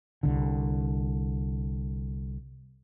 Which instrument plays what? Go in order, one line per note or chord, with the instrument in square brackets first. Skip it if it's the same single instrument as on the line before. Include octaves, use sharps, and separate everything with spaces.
[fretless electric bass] C2 D3